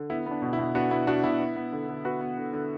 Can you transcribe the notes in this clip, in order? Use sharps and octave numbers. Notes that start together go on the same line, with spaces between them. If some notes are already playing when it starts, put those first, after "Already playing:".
Already playing: D3
B3 E4
B3 D4
B2
E4
B2
B3 D4 F#4
B3 E4
B2 D4 F#4
B2 E4
B3
B3
D3
D3
B3 F#4 B4
B3
D3
D3